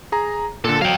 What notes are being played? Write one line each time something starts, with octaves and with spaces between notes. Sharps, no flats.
G#4 A#5
A#2 D3 A4
F#3 F5 G5